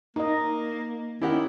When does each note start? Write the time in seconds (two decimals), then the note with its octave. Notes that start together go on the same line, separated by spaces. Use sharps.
0.16 A#3 D#4 D#5
1.22 D#3 C#4 E4 G4 F#5